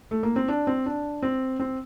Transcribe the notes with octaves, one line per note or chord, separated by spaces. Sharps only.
A3
A#3
C4
D4
C4
D4
C4
C4